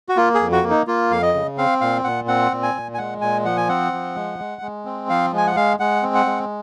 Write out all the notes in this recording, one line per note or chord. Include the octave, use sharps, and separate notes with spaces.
F#4
A#3 F4
G#4
F2
F#4
A#3
D#4
A#3 F4
F2 F5
D#5
C#3
C4 F5
A#2 F5
A#2 F#5
C4 F#5
A#2
G#5
A#2
G#5
G#3 F#5
A#2 G#5
F3 F#5
G#5
C4 F#5
F3
G#3
G#3
G#3
C4
F3 F5
G#3 G#5
F#5
G#3 F5
G#3 F#5
C4
F#5
G#3